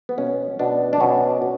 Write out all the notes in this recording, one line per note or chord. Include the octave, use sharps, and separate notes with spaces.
B3
B2 C#4
B2 D4
D4
B2 C#4
B2